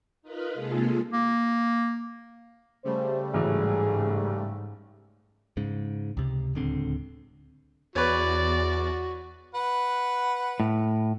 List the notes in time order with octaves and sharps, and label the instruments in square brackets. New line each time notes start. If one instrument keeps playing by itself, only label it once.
[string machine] D#4 F4 A#4 B4 B5
C3 G#3 A#3 F4 G#4 A4
[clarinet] A#3
[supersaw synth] C#3 G3 A3 [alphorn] C5
[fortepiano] A1 E3 F#3 [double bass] G#2 [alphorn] G#4
[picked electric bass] G#2 C#3
C#2 C3
D1 C#2 D3 C4
[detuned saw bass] E2 [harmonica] F#4 [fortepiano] B4 C#5 [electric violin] D5
[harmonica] B4 F#5
[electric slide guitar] A2